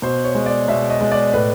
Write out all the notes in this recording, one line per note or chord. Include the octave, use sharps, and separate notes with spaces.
B2 C5
C#5
G#3
D5
B2 E5
D#5
G#3
D5
A2 B4